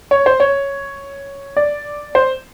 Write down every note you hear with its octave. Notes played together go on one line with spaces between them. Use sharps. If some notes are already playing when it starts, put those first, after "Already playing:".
C#5
C5
C#5
D5
C5